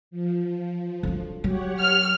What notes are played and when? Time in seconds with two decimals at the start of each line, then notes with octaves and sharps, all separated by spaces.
0.11 F3
1.03 D3 F#3
1.44 F#3 G4 C#5 F#5
1.80 F6